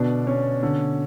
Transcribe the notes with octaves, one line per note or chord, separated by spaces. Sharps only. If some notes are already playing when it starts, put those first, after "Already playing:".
Already playing: B2 D3 B3 D4
C#4
D3